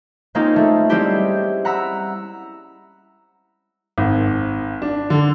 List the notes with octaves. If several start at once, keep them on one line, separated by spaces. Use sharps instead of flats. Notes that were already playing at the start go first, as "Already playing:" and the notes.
G#3 A#3 C4 C#4 D#4 F4
A3
G3 G#3 C4 C#4 E4 G4
F#5 A#5 B5 E6
G#1
D4
D3